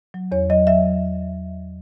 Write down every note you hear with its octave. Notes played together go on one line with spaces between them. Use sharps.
F#3
E2 C#5
F#3 D#5
F#3 E5